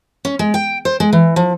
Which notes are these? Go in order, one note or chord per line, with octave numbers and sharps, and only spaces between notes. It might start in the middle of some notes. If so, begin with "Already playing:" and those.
C#4
G#3
G5
C5
G#3
E3
F3